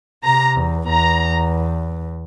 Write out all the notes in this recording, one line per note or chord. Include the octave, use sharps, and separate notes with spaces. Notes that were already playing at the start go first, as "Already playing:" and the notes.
C3 A#5
E2
E2 A#5